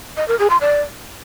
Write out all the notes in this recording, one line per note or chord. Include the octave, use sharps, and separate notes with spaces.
D#5
A#4
G#4
C6
D5